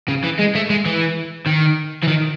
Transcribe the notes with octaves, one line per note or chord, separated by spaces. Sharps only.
C#3
E3
G#3
A3
G#3
E3
D#3
E3
D#3